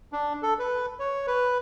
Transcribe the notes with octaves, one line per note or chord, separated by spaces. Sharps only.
D4
A4
B4
C#5
B4